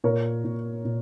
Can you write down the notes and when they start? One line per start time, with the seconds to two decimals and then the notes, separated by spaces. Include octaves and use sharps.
0.04 A#2 A#4 C#5
0.44 A#2
0.85 A#2